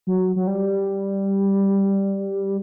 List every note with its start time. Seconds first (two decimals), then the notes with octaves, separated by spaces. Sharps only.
0.07 F#3
0.36 F#3
0.47 G3